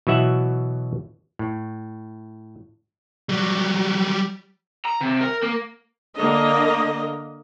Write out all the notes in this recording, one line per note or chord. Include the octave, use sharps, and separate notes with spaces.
B2 E3 F#3 E5 F#5
A2
F#3 G3
A#5
C3
A#4
A#3
D3 A#3 D#5